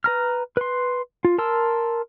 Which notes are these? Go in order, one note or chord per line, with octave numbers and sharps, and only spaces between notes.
B4 A#5 F6
B4 C6
F4
A#4 A5 C6 E6